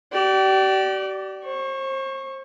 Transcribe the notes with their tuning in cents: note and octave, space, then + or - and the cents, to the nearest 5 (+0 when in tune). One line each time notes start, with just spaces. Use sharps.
G4 -40 D5 +0
C5 +35 C#6 -15